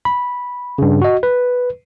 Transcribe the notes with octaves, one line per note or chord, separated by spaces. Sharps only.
B5
G2 C#3
F#4 D#5
B4